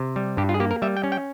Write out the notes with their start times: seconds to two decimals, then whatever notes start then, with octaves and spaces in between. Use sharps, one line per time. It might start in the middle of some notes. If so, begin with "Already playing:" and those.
Already playing: C3
0.16 G3
0.37 G2 G4
0.49 F4
0.54 G#4
0.60 A#3 G4
0.71 A#4
0.82 G3 E5
0.97 G5
1.03 C#4
1.12 G5